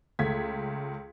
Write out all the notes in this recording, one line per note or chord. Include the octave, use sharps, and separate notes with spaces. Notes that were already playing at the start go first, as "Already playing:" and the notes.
C#2 A3 G#6 B6